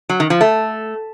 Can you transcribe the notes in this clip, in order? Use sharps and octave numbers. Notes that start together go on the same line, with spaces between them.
F#3
D#3
F3
A3